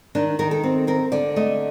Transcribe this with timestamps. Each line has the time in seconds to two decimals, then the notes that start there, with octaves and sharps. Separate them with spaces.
0.15 D#3 D4
0.39 D#3 A#4
0.51 A4
0.63 C4
0.87 C4 A#4
1.12 D3 D5
1.36 A3 D#5